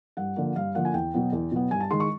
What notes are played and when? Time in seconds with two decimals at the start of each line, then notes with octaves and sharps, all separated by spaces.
0.17 G2 F#5
0.36 D3 F3 A#3
0.55 G2 F5
0.75 D3 F3 A#3 F#5
0.85 G#5
0.94 E2 G5
1.14 B2 F#3 B3
1.32 E2
1.52 B2 F#3 B3
1.71 G2 G#5
1.80 A5
1.91 D#3 G#3 C6
2.00 C#6